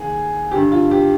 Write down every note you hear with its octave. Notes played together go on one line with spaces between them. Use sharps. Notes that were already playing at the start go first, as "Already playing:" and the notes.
Already playing: D#2 D#3 G#4
G2 D3 G4
F4
G4